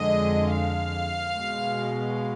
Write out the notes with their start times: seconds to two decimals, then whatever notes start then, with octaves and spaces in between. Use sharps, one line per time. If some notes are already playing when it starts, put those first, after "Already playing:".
Already playing: F2 D3 G#3 D#5
0.52 F5
1.35 B2 G#3